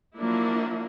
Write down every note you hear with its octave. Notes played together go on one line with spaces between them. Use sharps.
F3 F#3 A#3 D4 E4